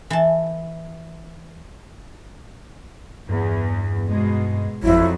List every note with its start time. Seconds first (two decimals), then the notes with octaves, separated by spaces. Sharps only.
0.10 E3 A5
3.29 E2 G2
4.09 G#2 B2 G#3
4.83 G#1 F2 F#3 E4